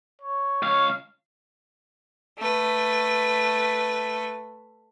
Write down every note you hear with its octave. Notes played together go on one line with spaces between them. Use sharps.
C#5
C#2 C#5 F5
A3 B4